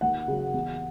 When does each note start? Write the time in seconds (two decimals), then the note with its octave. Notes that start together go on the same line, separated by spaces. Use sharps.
0.01 D#2 F#5
0.28 C#3 F#3
0.54 E2